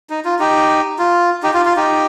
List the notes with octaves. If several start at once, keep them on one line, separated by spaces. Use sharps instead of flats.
D#4
F4
D#4 G4
F4
D#4 G4
F4
F4
D#4 G4